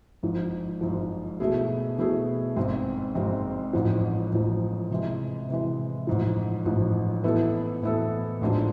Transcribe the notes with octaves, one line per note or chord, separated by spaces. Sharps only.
G#1 G#2 F3
G#1 G#2 F3
B2 A3 E4 G#4
B2 A3 E4 G#4
G#1 G#2 G#3 C4
G#1 G#2 G#3 C4
A1 G#2 F3
A1 G#2 F3
C3 E3 G#3
C3 E3 G#3
A1 G#2 F3
A1 G#2 F3
A2 E3 B3 E4 A4
A2 E3 B3 E4 A4
A1 G#2 G#3 D4 F4